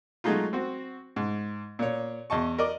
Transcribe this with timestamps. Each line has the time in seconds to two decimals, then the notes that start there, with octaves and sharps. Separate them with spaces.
0.24 F#3 G#3 A3 D#4 F4
0.53 C4 F#4
1.16 G#2
1.79 A#2 C#5
2.30 E2 D#5 A5 C#6
2.58 A#4 D5 D#5 D6